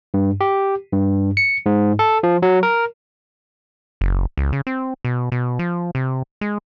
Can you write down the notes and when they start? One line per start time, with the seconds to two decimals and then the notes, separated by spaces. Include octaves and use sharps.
0.14 G2
0.41 G4
0.92 G2
1.37 C#7
1.66 G#2
1.99 A4
2.23 F3
2.42 F#3
2.63 A#4
4.01 F#1
4.37 C#2
4.52 C#3
4.67 C4
5.05 B2
5.32 B2
5.59 F3
5.95 C3
6.41 G#3